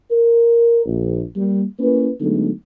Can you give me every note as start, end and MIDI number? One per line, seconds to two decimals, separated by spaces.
0.11 0.81 70
0.86 1.22 34
1.36 1.63 55
1.36 1.63 58
1.80 2.09 58
1.80 2.09 61
1.80 2.09 64
1.80 2.09 71
2.21 2.50 50
2.21 2.50 54
2.21 2.50 56
2.21 2.50 57
2.21 2.50 59
2.21 2.50 63